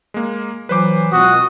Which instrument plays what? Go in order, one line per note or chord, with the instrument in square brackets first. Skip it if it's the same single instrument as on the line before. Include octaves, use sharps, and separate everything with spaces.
[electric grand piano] G#3 A#3
[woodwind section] E3 F#3 F4 [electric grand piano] B4 C5 D6
[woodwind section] C#2 B2 C4 [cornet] F#4 [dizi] D#6